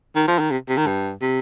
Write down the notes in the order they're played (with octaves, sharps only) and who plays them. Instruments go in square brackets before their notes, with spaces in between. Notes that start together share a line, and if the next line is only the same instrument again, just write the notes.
[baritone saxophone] D#3
F3
D#3
C3
C3
D#3
G2
C3